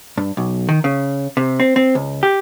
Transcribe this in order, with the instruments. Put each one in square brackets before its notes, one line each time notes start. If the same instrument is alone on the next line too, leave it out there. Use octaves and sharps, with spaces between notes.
[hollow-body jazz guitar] G2
B1
D#3
C#3
C3
C4
C4
C#2
G4